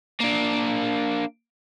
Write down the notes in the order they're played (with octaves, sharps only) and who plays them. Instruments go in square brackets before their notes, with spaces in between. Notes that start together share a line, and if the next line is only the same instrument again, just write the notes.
[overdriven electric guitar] A#3 D4